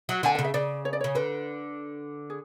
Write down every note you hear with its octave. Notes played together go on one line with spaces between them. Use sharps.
F#3
D3 G#5
C#3 F#5
E5
C#3 D5
C#5
D5
C#3 C#5
D3 B4
G#4